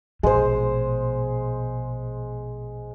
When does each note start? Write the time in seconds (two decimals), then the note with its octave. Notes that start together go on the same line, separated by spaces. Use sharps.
0.23 A#1 B2 G#3 C5